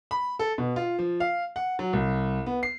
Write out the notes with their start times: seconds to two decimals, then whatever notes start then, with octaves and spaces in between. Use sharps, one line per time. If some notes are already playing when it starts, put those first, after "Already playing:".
0.11 B5
0.39 A4
0.58 B2
0.76 F4
0.99 F3
1.20 F5
1.56 F#5
1.79 F#3
1.93 C2
2.46 B3
2.63 C7